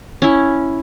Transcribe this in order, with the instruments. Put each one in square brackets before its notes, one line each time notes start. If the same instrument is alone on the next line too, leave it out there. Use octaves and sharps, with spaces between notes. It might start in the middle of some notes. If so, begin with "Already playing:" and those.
[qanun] C#4 E4